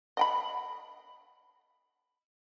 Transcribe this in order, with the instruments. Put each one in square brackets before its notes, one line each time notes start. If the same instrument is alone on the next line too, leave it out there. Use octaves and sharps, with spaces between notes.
[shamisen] D#5 G5 B5